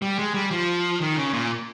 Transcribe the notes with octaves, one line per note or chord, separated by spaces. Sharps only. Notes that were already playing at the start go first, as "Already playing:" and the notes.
G3
G#3
G3
F3
D#3
C#3
A#2